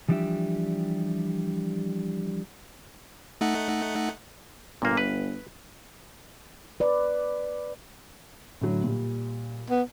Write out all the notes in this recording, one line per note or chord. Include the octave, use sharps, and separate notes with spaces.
E3 F3 G3 D4 G4 E5
A3 D#4 F#5
G1 A#2 A#3
B4
B4 D5
A2 D3 F#3
A#2 G3
B3